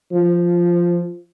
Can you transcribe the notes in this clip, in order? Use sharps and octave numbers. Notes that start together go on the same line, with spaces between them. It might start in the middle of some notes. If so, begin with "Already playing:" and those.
F3